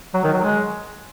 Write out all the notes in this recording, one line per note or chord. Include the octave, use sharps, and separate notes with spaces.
F#3
D#3
F#3
G#3